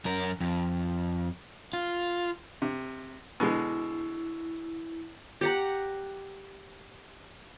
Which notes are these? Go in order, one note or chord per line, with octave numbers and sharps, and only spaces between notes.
F#2 A#4
F2
F4
C3
B2 D3 G#3 E4
G4 F#5 A#5